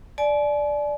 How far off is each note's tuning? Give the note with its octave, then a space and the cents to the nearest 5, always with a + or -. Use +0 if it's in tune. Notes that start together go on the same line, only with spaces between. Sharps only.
D5 +0 G#5 +45